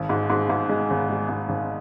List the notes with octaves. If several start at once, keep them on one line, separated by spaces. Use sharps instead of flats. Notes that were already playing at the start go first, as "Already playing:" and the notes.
Already playing: G#1
G#2
G#2
G#2
G#3
G#1
G#3
G#2
G#1